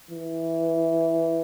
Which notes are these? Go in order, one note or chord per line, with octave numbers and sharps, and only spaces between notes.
E3